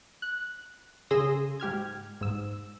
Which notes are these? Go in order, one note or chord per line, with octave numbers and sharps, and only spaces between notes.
F#6
C#3 G#4 C6 D#6 E6 A#6
G#2 G4 F6 G#6
G#2 E6